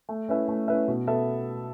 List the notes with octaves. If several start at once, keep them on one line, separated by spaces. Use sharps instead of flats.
A3
C#4 E4 B4 E5
A3
C#4 E4 B4 E5
B2
B3 A4 E5